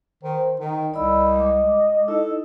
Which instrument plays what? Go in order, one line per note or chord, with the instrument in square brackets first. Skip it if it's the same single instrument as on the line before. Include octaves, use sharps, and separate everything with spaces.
[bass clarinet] D#3 [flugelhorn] C5
[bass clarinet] D#3 [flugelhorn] D#4
[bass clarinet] C2 [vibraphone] D5 B5 E6 [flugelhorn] D#5
[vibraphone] G#3 D6
[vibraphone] D#4 E4 [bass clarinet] A4